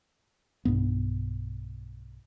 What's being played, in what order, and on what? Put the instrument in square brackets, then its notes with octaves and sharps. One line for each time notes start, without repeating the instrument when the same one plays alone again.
[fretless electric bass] B1 G2 B3